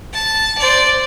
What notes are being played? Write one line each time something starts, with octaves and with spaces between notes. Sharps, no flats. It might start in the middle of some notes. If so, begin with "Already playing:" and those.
A5
C5 D5